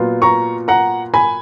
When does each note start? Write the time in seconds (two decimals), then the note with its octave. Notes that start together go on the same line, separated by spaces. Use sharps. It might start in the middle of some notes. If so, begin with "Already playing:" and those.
Already playing: A#2 F#3 B3 F4
0.22 A#5 C#6
0.68 F#5 A#5
1.14 G#5 B5